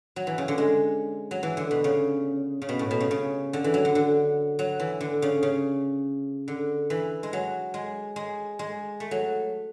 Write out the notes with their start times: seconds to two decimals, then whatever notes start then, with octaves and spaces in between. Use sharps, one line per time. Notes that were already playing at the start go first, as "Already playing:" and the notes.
0.16 F#3
0.27 E3
0.38 C#3
0.48 D3
0.58 G#3
1.31 F#3
1.43 E3
1.57 D3
1.71 B2
1.84 C#3
2.62 C#3
2.69 B2
2.79 A2
2.91 B2
3.01 C#3
3.11 C#3
3.53 D3
3.64 E3
3.74 F#3
3.85 D3
3.95 D3
4.59 F#3
4.80 E3
5.01 D3
5.22 C#3
5.43 C#3
6.48 D3
6.90 E3
7.23 G#3
7.33 F#3
7.74 G#3
8.16 G#3
8.59 G#3
9.00 A3
9.11 F#3